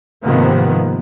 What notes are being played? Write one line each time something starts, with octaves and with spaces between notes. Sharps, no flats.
G#2 C3 D#3 F3 A#3 B3